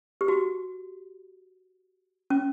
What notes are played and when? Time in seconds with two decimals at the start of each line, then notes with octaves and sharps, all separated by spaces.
0.21 G4
0.28 F#4
2.30 C#4